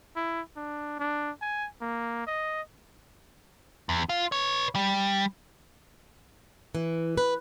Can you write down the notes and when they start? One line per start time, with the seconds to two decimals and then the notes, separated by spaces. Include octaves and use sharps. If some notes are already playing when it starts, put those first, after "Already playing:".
0.16 E4
0.56 D4
0.99 D4
1.41 G#5
1.81 A#3
2.27 D#5
3.89 E2
4.09 F4
4.32 B4 C#5
4.75 G3
6.75 E3
7.18 B4